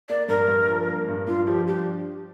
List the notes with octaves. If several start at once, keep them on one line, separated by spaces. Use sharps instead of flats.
A#3 D5
G2 A#4
G2
F3
A#3
G2
G2 F4
F3 G4
D4 G4